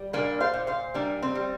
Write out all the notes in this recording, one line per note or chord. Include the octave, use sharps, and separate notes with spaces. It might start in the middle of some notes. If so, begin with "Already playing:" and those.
Already playing: G3
A#2 A#3 D4
C5 F5
A#2
C5 F5
G3 A#3 D4
C4
G3